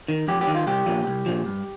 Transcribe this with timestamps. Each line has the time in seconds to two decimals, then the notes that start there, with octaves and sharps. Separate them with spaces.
0.08 D#3
0.28 F2 G4
0.41 G4
0.47 D#3
0.55 F4
0.67 C2 G4
0.86 A#2 F3
1.07 C2
1.26 A#2 F3
1.46 G2